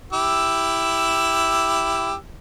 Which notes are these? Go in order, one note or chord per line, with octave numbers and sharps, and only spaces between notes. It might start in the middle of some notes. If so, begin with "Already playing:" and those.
E4 G4 E6